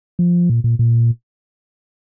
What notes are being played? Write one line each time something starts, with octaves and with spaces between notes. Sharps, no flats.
F3
A#2
A#2
A#2